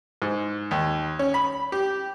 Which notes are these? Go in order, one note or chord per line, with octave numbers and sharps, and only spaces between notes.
G#2
D#2
C#4
B5
G4